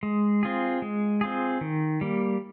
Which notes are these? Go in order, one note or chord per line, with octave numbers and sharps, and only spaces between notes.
G#3
C4 F4 G#4
G#3
C4 F4 G#4
D#3
G3 A#3